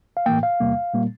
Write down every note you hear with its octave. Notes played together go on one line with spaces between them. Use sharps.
F5
A2 E3 A#3 G5
F5
E2 C3 G3 A#3
A#2 G3 A#3